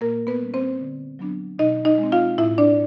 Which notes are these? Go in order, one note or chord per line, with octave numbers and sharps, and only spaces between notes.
A#2 A#3 A#4
B3 B4
G3 A#3 C#4
C4 C5
D3
F#3 B3 D4
B2 D#4 D#5
D#4 D#5
G#3
C4
F4 F5
A2 E4 E5
D4 D5